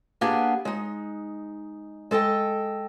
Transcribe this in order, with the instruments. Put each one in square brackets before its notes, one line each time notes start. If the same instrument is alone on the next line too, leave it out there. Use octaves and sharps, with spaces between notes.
[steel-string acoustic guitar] A#3 B3 D4 G4 G#4
G#3 D#4
G#3 A4 D#5 G5